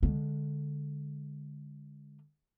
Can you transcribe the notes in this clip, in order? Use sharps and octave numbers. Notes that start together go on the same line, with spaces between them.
D3 G#3